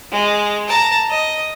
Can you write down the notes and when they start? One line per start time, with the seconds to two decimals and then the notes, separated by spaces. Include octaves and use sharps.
0.11 G#3
0.68 A5 A#5
1.10 D#5